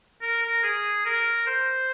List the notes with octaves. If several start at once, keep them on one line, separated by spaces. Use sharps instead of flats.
A#4
A#4
G#4
A#4
C5